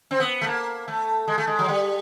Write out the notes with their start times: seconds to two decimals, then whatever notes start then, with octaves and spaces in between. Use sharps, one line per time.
0.11 C4
0.20 B3
0.41 A3
0.47 A#3
0.88 A3
1.28 G#3
1.38 A3
1.47 G#3
1.59 F#3
1.68 G3